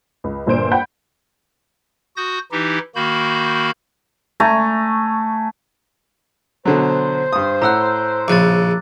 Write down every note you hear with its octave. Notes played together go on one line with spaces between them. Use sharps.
C#2
G1 A#2 D4 C5 D7
F#5 G5 B5 G6
F#4 D#6 G6 A#6
E3 D#4 E4 G4
D#3 A#3 F#4 B5 G6
A3 G#5 A#5
B2 D3 F#3 C5
G2 D#6
A2 F#5 A#5 E6 F#6
A#1 C#3 D6 F#6 A6